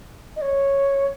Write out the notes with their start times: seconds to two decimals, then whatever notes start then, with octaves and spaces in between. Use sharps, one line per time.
0.36 D#5
0.42 C#5